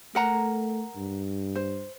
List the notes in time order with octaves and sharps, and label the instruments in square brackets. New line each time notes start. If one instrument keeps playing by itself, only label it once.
[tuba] A3 [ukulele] A#4 F#5 A#5
[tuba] G2
[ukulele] C5